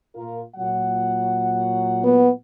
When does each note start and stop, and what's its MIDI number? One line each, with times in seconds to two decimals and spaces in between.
0.15 0.42 46
0.15 0.42 65
0.15 0.42 70
0.56 2.34 46
0.56 2.34 54
0.56 2.34 78
2.04 2.30 59